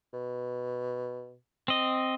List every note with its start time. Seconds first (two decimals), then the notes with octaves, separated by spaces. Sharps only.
0.14 B2
1.68 C4 D#5